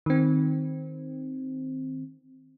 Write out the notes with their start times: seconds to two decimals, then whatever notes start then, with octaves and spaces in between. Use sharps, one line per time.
0.06 D#3 C4